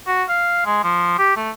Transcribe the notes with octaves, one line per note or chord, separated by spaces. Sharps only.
F#4
F5
G#3
F3
G4
A3